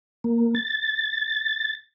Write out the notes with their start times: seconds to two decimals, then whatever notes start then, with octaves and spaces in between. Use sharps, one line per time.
0.24 A#3
0.55 A6